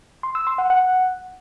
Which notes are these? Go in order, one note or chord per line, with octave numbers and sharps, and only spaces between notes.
C6
E6
C6
F#5
F#5